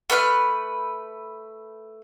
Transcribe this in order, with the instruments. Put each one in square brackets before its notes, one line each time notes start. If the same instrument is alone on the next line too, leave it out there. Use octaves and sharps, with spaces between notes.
[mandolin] A3 B4 F5 F6